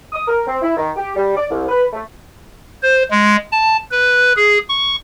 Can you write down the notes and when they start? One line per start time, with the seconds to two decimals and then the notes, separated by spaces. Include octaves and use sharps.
0.13 D#6
0.27 A#4
0.47 C4
0.62 E4
0.77 D#3
0.96 G4
1.16 G3
1.36 D5
1.51 C2
1.69 B4
1.93 A3
2.83 C5
3.11 G#3
3.52 A5
3.91 B4
4.36 G#4
4.69 C#6